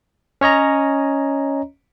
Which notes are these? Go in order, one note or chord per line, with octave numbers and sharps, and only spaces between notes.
C#4 C#5 D#5 A#5